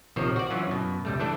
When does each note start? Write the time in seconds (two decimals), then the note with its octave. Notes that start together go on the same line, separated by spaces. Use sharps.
0.16 A#1 C3 D#3 F3 C5 C#5
0.36 F#4 D5
0.50 E3 F#3 C#4 F4
0.67 F#2 B2
1.05 C#2 G3 A3
1.20 E3 A3 D4 A4